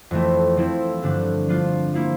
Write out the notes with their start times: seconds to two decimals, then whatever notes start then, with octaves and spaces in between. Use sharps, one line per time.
0.11 F2 E3 A3
0.57 F3 C4 E4 A4
1.02 G2 D3 A3 D4
1.48 F3 A3 D4 F4
1.94 F3 A#3 E4